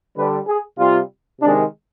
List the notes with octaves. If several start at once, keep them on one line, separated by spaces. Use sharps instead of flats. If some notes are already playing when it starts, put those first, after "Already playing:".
D3 G3 B4
G#4
C3 G3 F4
C3 D#3 G#3 D4